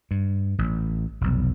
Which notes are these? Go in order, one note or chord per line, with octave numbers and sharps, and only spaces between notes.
G2
A1
F1 B1